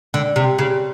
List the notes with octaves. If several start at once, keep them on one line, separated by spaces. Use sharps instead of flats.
D3
C3
C#3